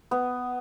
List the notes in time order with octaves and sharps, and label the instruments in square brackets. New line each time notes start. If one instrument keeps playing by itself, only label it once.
[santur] B3